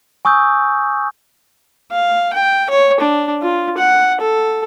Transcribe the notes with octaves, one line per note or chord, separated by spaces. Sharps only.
G#5 C#6 D#6 E6 G6
F5
G5
C#5
D4
F4
F#5
A4